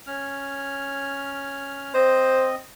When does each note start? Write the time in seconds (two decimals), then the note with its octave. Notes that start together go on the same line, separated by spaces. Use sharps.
0.07 C#4 F6
1.94 C4 C5 D#5